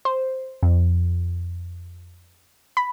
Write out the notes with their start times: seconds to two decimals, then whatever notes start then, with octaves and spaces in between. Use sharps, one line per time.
0.05 C5
0.63 F2
2.77 B5